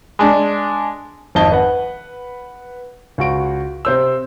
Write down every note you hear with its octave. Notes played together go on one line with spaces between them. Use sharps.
G#3 D4
G#1 F2 D#5 A5 G7
B4 F#5
C#2 F#4 D7
C3 C5 E6